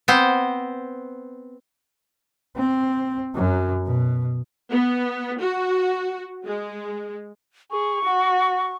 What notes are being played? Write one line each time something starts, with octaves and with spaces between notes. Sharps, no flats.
B3 C4 C5
C4
F#2 F#3
B2
B3
F#4
G#3
G#4 C#6
F#4